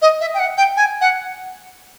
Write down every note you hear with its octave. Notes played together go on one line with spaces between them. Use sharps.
D#5
E5
G5
F#5
G5
G#5
F#5